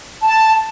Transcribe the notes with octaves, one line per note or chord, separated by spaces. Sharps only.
A5